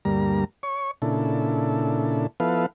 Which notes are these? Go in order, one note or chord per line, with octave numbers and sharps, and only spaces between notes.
D2 G2 G3 A#3 A#5
C#5 C#6
A#2 C#3 D4 E4 A4
F3 B3 E4 A4 B4 F5